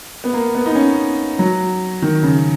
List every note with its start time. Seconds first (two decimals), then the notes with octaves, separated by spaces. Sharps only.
0.24 B3
0.33 A#3
0.55 B3
0.66 D#4
0.75 C#4
1.39 F#3
2.02 D#3
2.23 C#3